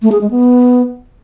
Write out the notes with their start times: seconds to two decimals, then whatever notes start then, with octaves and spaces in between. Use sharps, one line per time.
0.02 A3
0.12 G#4
0.21 G#3
0.31 B3